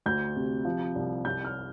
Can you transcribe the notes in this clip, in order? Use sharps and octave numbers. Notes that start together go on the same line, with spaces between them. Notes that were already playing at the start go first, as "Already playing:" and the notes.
D2 G6
C3
F3
C2
C2 G6
F6